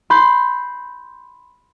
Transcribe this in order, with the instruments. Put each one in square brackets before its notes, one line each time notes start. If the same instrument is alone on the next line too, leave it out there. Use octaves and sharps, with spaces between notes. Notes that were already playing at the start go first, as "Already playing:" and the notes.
[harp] B5 C6 G6